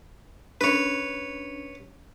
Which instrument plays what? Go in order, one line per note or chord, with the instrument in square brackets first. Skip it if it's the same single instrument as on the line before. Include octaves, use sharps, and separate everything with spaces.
[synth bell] C#4 D4 [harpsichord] B4 C#5